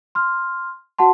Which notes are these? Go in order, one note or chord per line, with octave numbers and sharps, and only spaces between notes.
C6 F6
F#4 F#5 A5 C6